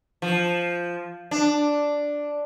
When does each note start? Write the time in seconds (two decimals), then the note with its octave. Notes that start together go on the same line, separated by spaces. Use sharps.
0.22 F3
1.31 D4